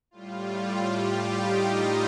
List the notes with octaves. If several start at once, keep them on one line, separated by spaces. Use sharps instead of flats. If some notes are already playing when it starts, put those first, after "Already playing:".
A2 G3 F4
G3 G4
D#4 D#5